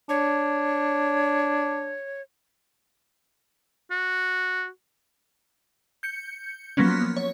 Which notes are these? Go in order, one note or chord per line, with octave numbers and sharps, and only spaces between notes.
D4 C#5
F#4
G6 C#7
F3 F#3 A#3 B3 C#4
C#5